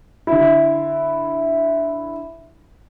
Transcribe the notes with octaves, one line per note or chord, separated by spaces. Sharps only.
D3 E4